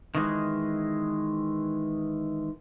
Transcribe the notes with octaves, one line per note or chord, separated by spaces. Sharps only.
D#3 E3 G#3